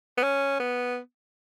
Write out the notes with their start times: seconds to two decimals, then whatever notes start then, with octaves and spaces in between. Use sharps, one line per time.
0.18 B3
0.23 C#4
0.60 B3